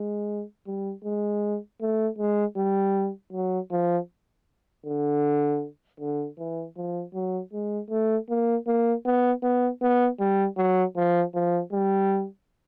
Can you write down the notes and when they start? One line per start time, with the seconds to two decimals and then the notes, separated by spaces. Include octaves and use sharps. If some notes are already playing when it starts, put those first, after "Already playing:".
Already playing: G#3
0.67 G3
1.04 G#3
1.81 A3
2.19 G#3
2.57 G3
3.33 F#3
3.71 F3
4.86 D3
6.00 D3
6.39 E3
6.77 F3
7.14 F#3
7.53 G#3
7.90 A3
8.29 A#3
8.67 A#3
9.05 B3
9.43 B3
9.82 B3
10.20 G3
10.57 F#3
10.96 F3
11.34 F3
11.72 G3